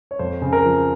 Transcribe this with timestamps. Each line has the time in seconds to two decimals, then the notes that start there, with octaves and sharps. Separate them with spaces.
0.11 C#5
0.19 F2 C5
0.42 C#3
0.53 A#4
0.65 F3